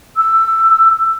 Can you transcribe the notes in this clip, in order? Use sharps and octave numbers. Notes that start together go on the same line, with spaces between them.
E6